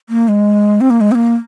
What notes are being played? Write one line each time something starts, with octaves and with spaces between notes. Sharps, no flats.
A#3
G#3
C4
A#3
G#3
C4
A#3